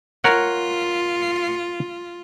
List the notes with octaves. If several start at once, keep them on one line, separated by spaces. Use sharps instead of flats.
F4 A#4 C#5 F#5